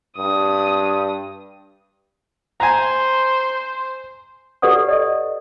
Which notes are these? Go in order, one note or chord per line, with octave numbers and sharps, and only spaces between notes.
G2 D#6
C5 G#5 A#5
G4 A4 B4 D5 F#5 D#6
D5 D#5